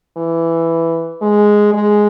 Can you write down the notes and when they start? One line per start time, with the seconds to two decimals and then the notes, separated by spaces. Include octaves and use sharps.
0.17 E3
1.21 G#3
1.73 G#3